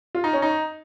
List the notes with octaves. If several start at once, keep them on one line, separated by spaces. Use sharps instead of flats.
F4
D#4
C#4
D#4